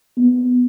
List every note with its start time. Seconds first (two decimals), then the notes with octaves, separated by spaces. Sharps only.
0.17 B3